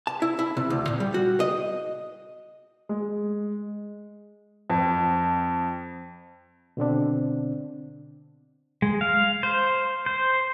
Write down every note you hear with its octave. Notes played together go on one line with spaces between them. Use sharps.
A5
E4
E4
C3
D2
A#2
G3
F#4
D#5
G#3
F2
B2 D3 C4 D4
G#3
F5
C5
C5